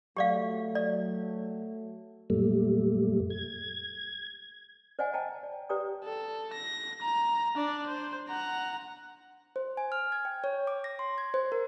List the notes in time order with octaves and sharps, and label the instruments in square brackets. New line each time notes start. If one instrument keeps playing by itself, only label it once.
[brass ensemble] F#3 A3 [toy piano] G4 D5 F5
[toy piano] D5
[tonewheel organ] F#2 A#2 G3 A3
G#6
[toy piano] C5 D5 D#5 F#5 G#5
D#5 G5 A5 A#5
D5
G4 B4 D5 G5 A#5 D#6
[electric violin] A4
A#6
A#5
D4 D5
C5
F#5 A#5
[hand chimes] C5
G#5
F6
G#6
G5
C#5
D6
A#6
C6
G#6
C5
A#4